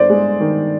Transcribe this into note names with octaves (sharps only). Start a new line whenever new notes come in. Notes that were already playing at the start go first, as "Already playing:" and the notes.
Already playing: G1 C5 D5
G#3
D#3